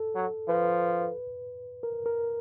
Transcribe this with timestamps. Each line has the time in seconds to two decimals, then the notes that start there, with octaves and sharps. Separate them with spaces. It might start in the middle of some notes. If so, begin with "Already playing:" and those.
Already playing: A4
0.15 F#3
0.49 F3 B4
1.83 A#4
2.06 A#4